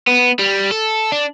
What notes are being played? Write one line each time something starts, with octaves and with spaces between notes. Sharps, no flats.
B3
G3
A4
D4